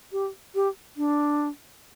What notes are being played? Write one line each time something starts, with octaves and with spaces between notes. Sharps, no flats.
G4
G4
D4